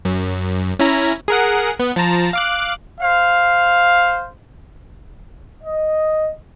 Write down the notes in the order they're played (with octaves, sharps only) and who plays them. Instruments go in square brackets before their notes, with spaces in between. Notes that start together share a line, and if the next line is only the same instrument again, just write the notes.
[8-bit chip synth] F#2
C#4 E4 A#5
G#4 A#4 F#5
B3
F3 A5 A#5
F5 D6 F#6
[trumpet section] C5 F5
D#5